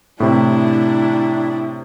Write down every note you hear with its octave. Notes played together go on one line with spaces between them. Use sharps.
A2 C3 D4 E4